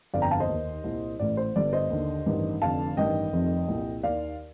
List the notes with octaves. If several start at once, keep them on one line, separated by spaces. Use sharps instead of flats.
G1 F2 D3 D5 F5
G5 A#5
F5 A5
C5 D#5
D#2 D#3
C2 A#2
A1 A2 D5
C5
G1 G2 D3 D5
C5 D#5
D#2 D3
A1 G2 D#3
F1 F2 D3 F5 A5
A1 G2 D#3 D#5 G5
F1 F2 C3 D#3
C2 A#2
D#2 D#3 D5 F5